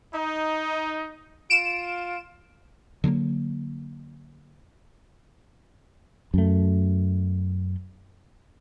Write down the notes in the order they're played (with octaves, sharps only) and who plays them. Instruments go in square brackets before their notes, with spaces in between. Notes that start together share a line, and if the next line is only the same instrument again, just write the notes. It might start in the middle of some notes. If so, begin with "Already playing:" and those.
[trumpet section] D#4
[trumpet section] F4 [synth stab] D7 E7
[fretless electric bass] D3 F#3 G3 A#3
F#2 A3